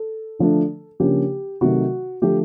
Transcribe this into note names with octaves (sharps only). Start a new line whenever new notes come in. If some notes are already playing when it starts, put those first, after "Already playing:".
Already playing: A4
D3 F3 A3 D4
C#3 F3 A#3 D4 G4
C3 D#3 F#3 A3 F#4
D3 F3 A3 G4